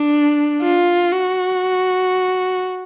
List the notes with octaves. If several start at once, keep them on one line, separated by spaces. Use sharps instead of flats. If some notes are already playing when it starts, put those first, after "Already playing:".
Already playing: D4
F4
F#4